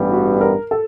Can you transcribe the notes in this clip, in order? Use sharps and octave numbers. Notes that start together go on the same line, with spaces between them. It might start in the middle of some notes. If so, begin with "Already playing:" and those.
Already playing: A1 G2 E3 G3 B3
F#4
A#4
A4